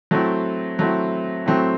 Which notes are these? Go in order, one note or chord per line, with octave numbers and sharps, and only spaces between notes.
F#3 A3 C4 E4
F#3 A3 C4 E4
F#3 A3 C4 E4